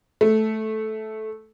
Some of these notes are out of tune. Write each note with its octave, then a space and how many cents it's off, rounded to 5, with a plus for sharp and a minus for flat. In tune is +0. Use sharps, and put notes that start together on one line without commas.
A3 -10